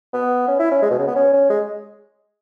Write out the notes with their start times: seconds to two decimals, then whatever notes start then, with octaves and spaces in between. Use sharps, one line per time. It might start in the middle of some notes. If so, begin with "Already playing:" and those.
0.14 B3
0.48 C#4
0.60 E4
0.72 C#4
0.83 G#3
0.91 B2
0.99 C#3
1.08 B3
1.16 C#4
1.34 C#4
1.50 G#3